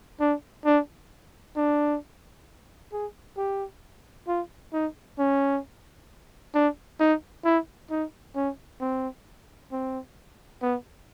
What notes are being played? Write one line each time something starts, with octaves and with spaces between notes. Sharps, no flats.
D4
D4
D4
G#4
G4
F4
D#4
C#4
D4
D#4
E4
D#4
C#4
C4
C4
B3